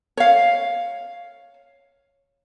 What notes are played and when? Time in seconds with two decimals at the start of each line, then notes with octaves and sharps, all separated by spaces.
0.17 C#5 F5